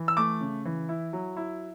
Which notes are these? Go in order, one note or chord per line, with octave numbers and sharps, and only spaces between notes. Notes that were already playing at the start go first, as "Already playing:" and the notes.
Already playing: E3
E6
A3 D6
C#3
E3
E4
F#3
E4